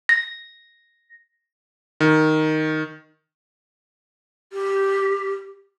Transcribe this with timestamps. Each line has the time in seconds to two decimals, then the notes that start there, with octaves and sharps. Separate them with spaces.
0.09 A#6
2.00 D#3
4.53 G4